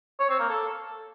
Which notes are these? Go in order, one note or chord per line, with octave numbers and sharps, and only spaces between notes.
C#5
C4
A#3
A4